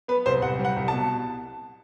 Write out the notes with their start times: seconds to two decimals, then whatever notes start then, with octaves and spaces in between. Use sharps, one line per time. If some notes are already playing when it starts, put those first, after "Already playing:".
0.08 B3 B4
0.26 C2 C5
0.42 C2 F#5
0.59 G3
0.65 F#5
0.77 C2
0.88 B2 A5